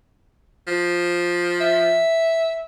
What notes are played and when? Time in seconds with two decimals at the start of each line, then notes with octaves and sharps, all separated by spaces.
0.67 F3
1.61 E5